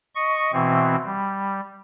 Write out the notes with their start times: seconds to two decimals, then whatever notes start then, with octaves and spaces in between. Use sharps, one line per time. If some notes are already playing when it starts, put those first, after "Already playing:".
0.15 D#5 C#6
0.53 B2 E3 C4
1.06 G3